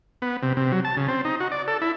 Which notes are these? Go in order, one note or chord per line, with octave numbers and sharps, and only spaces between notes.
B3
C3
C3
F#3
A5
C#3
C4
D#4
F#4
D5
A4
E4